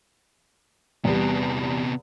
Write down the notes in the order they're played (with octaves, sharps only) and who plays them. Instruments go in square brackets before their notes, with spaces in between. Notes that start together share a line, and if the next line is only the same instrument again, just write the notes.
[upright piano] E2 G3 [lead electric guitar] C3 B3